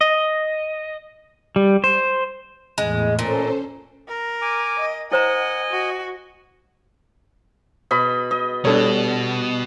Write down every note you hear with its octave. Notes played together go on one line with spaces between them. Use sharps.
D#5
G3
C5
E2 A2 G#3
A#2 C#4 A4 C5
A#4
G#5 D6
D#5
E4 C5 D#5 F#5 G#5 A#5
F#4
B2 D#5 B5
D#5
B2 G3 D4 A4 C#5